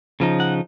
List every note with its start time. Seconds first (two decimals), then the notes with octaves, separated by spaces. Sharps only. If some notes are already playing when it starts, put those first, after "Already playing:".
0.20 C#3 F3 D#4
0.40 F#5